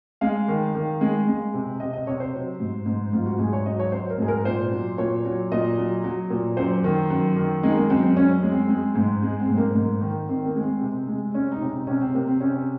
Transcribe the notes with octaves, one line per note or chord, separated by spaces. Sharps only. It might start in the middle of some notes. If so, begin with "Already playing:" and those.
G#3 F5
D#3
D#3
G#3
G#3
C3
C3 D#5
D#5
C3 C#5
C5
F#3
G#2
G#2
G#2 F4
F#4
G#2 G#4
C#5
F#3 D#5
C#5
F#3 C5
A#4
G#2 G#4
A#4
A#2 C5
F#3
A#2 C#5
F#3
A#2 D#5
F#3
F#3
A#2
F#2 C5
D#3
F#2
D#3
G#3 D#4
A#3
F#2 C4
C4
F#2 C#4
G#3
C4
G#3
G#2
G#3
C4
G#2
A#3
G#2
D#3
D#3 C4
A#3
G#3
C4
C3
G#3
G#3 C#4
D#4
C3
D#4
C3 C#4
C4
C3 A#3
C4
C3 C#4